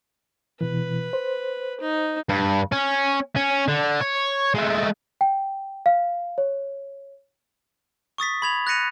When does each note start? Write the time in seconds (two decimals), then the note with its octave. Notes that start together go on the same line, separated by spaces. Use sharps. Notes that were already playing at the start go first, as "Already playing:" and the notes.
0.61 B2 E3 B4
1.13 C5
1.80 D#4
2.29 G2
2.72 C#4
3.37 C#4
3.68 D3
4.01 C#5
4.55 G#3 A3
5.21 G5
5.86 F5
6.38 C#5
8.18 C#6 D#6 A6 B6
8.42 B5 G#6 F7
8.67 F#6 A6 A#6 C#7 D#7 F7